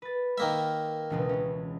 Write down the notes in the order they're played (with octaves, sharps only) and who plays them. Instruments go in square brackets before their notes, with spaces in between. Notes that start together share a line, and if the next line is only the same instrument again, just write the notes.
[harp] B4 A6
[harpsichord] D#3 A#3 E5
[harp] E1 C#2 B2
C#4